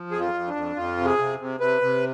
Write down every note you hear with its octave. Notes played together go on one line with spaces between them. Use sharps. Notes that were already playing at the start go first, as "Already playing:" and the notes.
Already playing: F3
F2 G#4
F4
F2
D4
F2
F2 F4
C3
G#4
C3
C3
C3 B4
C3